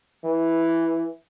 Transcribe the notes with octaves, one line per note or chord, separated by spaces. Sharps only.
E3